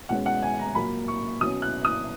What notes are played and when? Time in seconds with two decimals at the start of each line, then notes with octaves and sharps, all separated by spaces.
0.09 B2 G#3 C#4 F#5
0.26 F#5
0.42 G#5
0.59 A#5
0.75 A#2 F#3 A#3 B5
1.08 C#6
1.40 B2 F#3 C#4 D#6
1.62 F#6
1.85 D#6